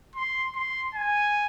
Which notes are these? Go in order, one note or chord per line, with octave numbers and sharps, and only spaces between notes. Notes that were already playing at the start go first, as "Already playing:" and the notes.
C6
C6
G#5